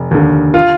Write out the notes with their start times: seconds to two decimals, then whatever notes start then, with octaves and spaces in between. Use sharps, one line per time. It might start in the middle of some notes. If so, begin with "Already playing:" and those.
Already playing: F1
0.11 D#2 D3
0.54 F4